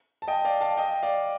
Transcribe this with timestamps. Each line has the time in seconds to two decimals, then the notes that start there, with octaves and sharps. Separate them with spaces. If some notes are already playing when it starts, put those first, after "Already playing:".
0.22 A5
0.28 D#5 G5
0.45 D5 F5
0.61 F5 A5
0.77 D#5 G5
1.03 D5 F5